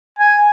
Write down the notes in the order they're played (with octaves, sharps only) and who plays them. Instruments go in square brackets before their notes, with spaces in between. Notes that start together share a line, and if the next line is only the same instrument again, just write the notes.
[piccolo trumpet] G#5